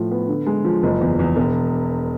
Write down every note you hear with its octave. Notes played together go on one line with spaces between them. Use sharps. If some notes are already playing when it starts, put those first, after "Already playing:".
Already playing: A2 F3
B3
D3
G#3
F3
F#1
E2
E2
E1